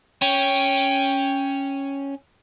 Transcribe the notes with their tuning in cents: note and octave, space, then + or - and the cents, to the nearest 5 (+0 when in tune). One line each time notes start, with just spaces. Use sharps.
C#4 +0 G5 +10